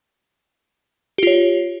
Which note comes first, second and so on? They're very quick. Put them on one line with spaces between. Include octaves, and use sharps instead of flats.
G4 F4 C#5